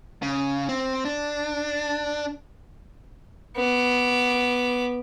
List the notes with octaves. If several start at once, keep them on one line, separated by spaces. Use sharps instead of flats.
C#3
C4
D4
B3 D6